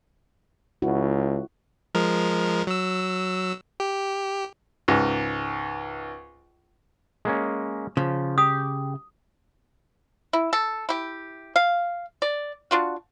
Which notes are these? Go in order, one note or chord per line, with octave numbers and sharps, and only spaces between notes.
C#2 E4 F#4
F3 G#3 A#4
F#3 E6
G4
C#2 G#2
G#3 A#3 C#4
C#3 F3
G4 D#6
E4
A4
E4 G4
F5
D5
D4 F4 F#4